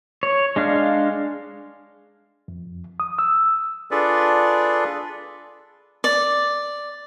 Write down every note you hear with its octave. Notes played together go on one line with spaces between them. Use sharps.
C#5
G#3 D4 F5
F2
D#6
E6
D4 F4 G#4 A4 B4 D5
D5